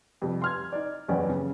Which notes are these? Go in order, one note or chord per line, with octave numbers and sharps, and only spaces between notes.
F2 C3 G3
C6 F6 G#6
D#4 D5
F#1 E2 B3 C#4 G4 D5
C#3